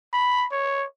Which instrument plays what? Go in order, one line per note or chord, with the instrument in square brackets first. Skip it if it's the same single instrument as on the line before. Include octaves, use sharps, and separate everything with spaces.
[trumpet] B5
C#5